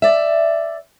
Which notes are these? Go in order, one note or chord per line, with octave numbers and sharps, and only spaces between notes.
D5 E5